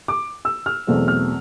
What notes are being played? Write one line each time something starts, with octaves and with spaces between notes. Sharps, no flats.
D6
E6
F6
E2 B2 F#3 A3 C4
F6